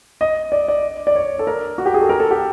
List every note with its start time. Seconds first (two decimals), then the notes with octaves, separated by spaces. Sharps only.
0.21 D#5
0.52 D5
0.68 D5
1.07 D5
1.16 C#5
1.39 A4
1.47 A#4
1.78 F#4
1.86 G4
1.94 G#4
2.01 A4
2.09 A#4
2.20 A4
2.31 G4